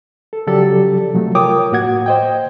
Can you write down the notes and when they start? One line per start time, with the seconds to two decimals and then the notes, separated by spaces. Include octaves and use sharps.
0.33 A4
0.47 C#3 F3 F#3 G4 A4 D5
1.14 C3 F3 F#3 A3
1.35 F4 A#4 C#5 G5 D6 D#6
1.72 A2 A#3 F#4 F#5 G#6
2.06 C5 D#5 G5